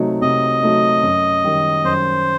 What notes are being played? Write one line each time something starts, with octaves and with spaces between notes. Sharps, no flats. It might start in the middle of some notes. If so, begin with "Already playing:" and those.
Already playing: C3 F#3 A3 D#4
C3 D#5
F#3 A3 D#4
F#2
D#3 G3
F#2 C5